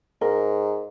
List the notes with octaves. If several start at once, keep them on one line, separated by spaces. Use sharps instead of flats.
G#2 A#4